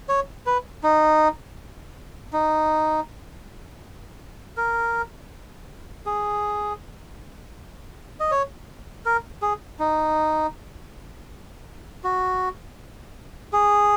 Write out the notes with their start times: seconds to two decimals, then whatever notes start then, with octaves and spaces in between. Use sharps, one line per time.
0.09 C#5
0.46 B4
0.83 D#4
2.33 D#4
4.57 A#4
6.06 G#4
8.20 D#5
8.31 C#5
9.06 A#4
9.42 G#4
9.79 D#4
12.04 F#4
13.53 G#4